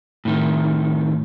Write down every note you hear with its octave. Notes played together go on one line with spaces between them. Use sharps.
A2 D#3